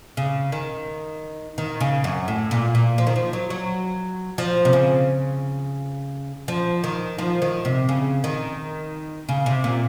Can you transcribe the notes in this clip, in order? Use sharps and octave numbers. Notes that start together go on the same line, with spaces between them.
C#3
D#3
D#3
C#3
F#2
A2
A#2
A#2
F3
D#3
F3
F#3
F#3
F3
C3
C#3
F3
D#3
F3
D#3
C3
C#3
D#3
C#3
C3
A#2